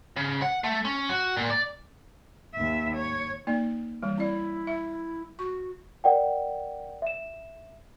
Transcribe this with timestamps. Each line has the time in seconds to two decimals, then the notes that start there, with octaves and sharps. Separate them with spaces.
0.16 C#3
0.42 F#5
0.64 A3
0.85 C#4
1.09 F#4
1.37 A#2
1.50 D5
2.54 D#2 E5
2.95 C#5
3.47 A#3 D#4 D5
4.03 E3 G3
4.18 C4 E4 D5
4.67 E5
5.39 F#4 C#6
6.04 A#4 D5 F#5 G5
7.02 E5 E7